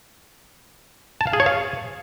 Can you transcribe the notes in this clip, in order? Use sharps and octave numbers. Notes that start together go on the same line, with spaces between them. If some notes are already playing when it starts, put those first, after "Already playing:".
A5
F5
G#4
C#5
F5